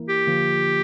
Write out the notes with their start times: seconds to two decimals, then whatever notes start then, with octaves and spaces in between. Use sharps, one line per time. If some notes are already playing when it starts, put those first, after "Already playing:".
Already playing: E3 A#3 E4 A#4
0.09 G4
0.27 D3 F3 A#3 F4